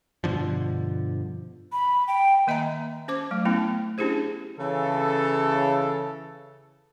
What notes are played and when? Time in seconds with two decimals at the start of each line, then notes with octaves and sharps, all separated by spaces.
0.24 G2 B2 D3 F3
1.72 B5
2.08 G5
2.47 D#3 A#3 D#5 E5 G#5 A#5
3.08 C#4 C5 D6
3.31 F#3 A3
3.45 A3 B3 C#4 E4
3.98 C#4 D4 E4 G4 G#4 C5
4.59 C#3 E3 A4